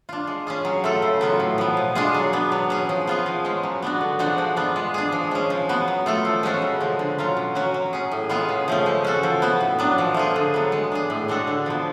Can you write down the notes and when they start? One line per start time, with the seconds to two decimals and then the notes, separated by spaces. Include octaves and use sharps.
0.09 D4 F4
0.27 G#3
0.47 C#4 F4 G#4
0.65 F#3
0.84 A3 F4 A4
1.02 C#3
1.21 F#3 B3 F4
1.40 A2
1.58 F3 B3
1.77 B2
1.95 G#3 D4 F4 G#4
2.14 F#3
2.33 B3 D4
2.52 F#3
2.70 C#4 G#4
2.89 F3
3.07 B3 F4 G#4
3.26 F3
3.45 G#3 C#4
3.63 F#3
3.82 B3 D4 F#4
4.01 D3
4.19 F3 G#3 D4 F#4
4.38 F3
4.56 B3 D4 F4
4.76 G#3
4.94 D4 G#4
5.12 F3
5.31 G#3 C#4
5.50 F3
5.69 B3 F#4
5.88 F#3
6.06 A3 F4 A4
6.25 F3
6.43 G#3 C#4 F#4 A4
6.62 C#3
6.80 F3 G#3
6.99 D3
7.18 F#3 C#4 F4
7.37 B2
7.55 F#3 C#4 F#4
7.74 F#3
7.93 C#4 G#4
8.11 A2
8.29 G#3 B3 F4 G#4
8.49 C#3
8.68 F3 A3 C#4
8.86 G#3
9.04 C#4 F#4 A4
9.23 F3
9.42 B3 F#4
9.61 A2
9.79 F#3 B3 D4
9.98 F3
10.14 A3 F4 G#4
10.36 D3
10.54 F#3 B3
10.72 G#3
10.92 D4 G#4
11.10 A2
11.28 G#3 D4 F#4 A4
11.47 D3
11.66 F3 B3